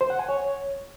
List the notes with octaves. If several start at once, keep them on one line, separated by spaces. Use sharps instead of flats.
C5
F#5
G#5
C#5